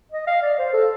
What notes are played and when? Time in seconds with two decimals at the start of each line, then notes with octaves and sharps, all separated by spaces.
0.12 D#5
0.27 F5
0.43 D5
0.59 C5
0.73 A4